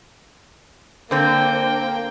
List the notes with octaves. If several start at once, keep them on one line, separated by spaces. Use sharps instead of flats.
D3 A#3 C4 G5